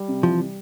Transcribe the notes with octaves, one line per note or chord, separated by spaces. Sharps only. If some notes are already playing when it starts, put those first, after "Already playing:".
Already playing: G3
C3
E3 F3
G3